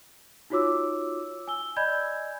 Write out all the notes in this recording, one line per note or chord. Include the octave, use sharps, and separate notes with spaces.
D#4 F4 F#4 C#5 D6 E6
G#5 E6 G7
D5 D#5 G#5 B5 G6 G#6